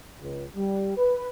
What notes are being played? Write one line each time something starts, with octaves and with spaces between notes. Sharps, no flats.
C#2
G3
B4